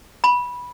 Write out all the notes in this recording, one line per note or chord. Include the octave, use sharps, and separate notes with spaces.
B5